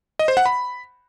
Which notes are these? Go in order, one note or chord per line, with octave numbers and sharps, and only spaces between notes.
D#5
C5
F#5
B5